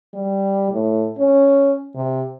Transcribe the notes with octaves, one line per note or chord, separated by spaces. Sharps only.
G3
A2
C#4
C3